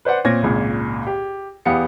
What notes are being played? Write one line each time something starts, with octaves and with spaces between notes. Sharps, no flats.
B4 C5 D5 F#5
A#2 C4 C#5 G#6 A#6
G#1 C#2 A#2
G4
E2 B3 G4 F5 C#7